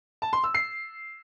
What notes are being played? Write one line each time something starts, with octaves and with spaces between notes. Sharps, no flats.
A5
C6
E6
C7